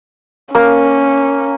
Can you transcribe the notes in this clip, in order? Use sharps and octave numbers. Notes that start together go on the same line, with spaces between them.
A#3 C#4